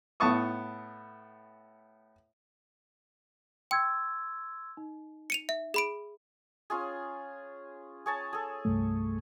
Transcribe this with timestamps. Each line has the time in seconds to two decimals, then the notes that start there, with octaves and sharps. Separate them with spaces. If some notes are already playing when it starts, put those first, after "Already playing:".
0.20 A2 B3 A5 C#6 D#6
3.71 G5 C6 E6 G#6
4.77 D#4
5.30 C#7 D#7 F7
5.49 E5
5.74 G#4 B5 D7
6.70 C#4 F4 G#4
8.06 G#4 C#5 A5
8.33 G#4 A4
8.65 C2 G2 A3